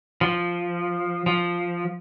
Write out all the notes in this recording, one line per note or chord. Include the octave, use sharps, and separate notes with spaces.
F3
F3